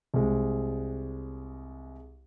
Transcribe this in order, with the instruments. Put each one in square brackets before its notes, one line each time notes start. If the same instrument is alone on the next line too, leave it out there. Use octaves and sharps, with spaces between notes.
[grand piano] C2 G#3